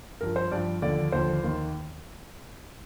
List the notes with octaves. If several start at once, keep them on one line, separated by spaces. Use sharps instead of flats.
G2 F3 A#4
C5
G2 F3 D5
D#2 D3 F3 D5
D#2 D3 F3 C5
D#2 D#3